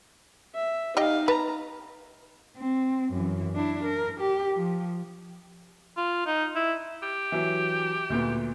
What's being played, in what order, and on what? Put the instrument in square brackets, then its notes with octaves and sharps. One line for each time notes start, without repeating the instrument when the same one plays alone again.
[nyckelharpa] E5
[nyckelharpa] D#4 F5 [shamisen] G4 D#5 G5
[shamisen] B4 [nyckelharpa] A#5
[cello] C4
F#2 E3
D4 E4
A#4
G4
F3
[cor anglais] F4
D#4
E4
[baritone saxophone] G4
[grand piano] E3 F#3
D2 A#2 B3